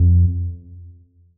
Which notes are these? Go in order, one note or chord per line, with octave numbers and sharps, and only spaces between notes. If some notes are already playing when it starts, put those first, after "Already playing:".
Already playing: F2